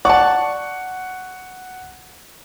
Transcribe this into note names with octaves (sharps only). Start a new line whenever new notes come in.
D5 F#5 A5 C#6